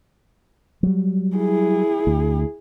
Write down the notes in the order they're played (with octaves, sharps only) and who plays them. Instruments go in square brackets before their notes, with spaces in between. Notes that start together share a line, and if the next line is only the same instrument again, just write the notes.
[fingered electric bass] F#3 G3
[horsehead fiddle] E4 G#4
[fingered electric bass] D2